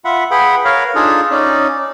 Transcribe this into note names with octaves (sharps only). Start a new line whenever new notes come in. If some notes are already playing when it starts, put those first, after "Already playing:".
F4 E5 F#5 B5
G#4 B4 F#5 G5 B5
A#4 B4 C#5 F5
D4 D#4 F4 G#4 A4
C#4 D#4 D5